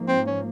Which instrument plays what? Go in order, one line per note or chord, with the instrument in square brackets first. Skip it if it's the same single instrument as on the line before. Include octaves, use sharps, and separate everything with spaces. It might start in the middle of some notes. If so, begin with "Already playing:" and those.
Already playing: [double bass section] G#2 F3 A#3
[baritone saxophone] C4
C#4